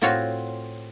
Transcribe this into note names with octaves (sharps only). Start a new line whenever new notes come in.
A2 C4 F4 F#4 C#5